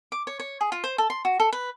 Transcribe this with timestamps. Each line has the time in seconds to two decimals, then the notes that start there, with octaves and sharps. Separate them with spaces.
0.12 D6
0.27 C#5
0.40 C#5
0.61 G#4
0.72 F4
0.84 C5
0.98 A4
1.10 C6
1.25 F#4
1.40 A4
1.53 B4